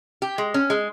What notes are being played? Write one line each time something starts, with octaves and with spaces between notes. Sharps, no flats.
G4
G#3
C#4
G#3